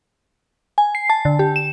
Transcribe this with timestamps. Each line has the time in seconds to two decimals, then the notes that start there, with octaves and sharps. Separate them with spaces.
0.78 G#5
0.95 C7
1.10 A5
1.25 D3
1.39 G4
1.56 E7